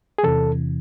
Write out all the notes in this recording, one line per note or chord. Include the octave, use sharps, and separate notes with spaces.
G#4
E2 C3 E3 A4